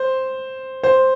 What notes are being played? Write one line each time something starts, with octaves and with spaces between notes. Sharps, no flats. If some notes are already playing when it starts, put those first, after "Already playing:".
Already playing: C5
C5